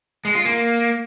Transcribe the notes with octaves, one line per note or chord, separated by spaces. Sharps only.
G#3
F4
A#3